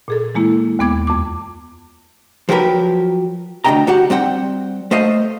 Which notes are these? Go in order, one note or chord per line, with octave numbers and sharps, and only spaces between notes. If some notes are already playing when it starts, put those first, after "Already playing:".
A#2 G#4 A4
E3 G#3 A#3 E4
D#2 G#3 B3 D6 G#6
F2 D6
F3 F#3 G4 A#4 B4
D2 A3 D4 D#5 G5 A#5
G2 F#4 G4 F#5
G3 C4 F#5 G5
A3 C5 D#5 F5